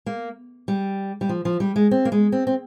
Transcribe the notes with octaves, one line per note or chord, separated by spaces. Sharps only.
A#3
G3
G3
F3
F3
G3
G#3
C4
A#3
G#3
C4
C4